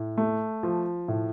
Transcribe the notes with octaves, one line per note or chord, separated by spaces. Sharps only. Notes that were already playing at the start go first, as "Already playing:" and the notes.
Already playing: A2
A3
F3
A2